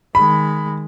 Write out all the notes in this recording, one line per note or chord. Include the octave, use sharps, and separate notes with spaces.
D#3 G#3 B5